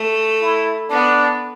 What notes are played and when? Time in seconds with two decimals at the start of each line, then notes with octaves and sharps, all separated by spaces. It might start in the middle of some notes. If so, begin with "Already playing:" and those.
Already playing: A3
0.41 E4
0.90 B3 D4